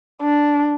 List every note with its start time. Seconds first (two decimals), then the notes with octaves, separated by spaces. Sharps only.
0.22 D4